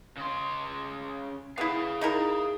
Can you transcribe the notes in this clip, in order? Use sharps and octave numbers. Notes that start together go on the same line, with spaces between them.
C#3 C6
B3 E4 G#4 F5
D#4 E4 A#4